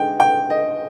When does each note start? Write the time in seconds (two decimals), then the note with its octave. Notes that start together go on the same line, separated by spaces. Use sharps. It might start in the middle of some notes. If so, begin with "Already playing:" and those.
Already playing: D3 G#3 D#4 G5
0.20 G5
0.50 D#5